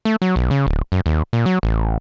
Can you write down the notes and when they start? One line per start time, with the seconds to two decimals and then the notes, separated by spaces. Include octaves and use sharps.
0.05 A3
0.22 F#3
0.36 B1
0.51 C#3
0.67 D1
0.92 F#2
1.06 D#2
1.33 A#2
1.46 F#3
1.63 A1